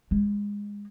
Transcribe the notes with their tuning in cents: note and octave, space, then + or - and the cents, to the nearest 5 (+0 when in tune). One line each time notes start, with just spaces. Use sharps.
G#3 -20